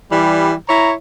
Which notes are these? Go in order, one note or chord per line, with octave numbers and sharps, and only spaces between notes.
E3 G3
E4 C#5 A#5